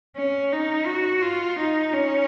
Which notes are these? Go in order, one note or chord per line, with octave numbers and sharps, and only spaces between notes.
C#4
D#4
F#4
F4
D#4
C#4